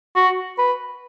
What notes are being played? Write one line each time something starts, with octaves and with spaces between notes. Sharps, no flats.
F#4
B4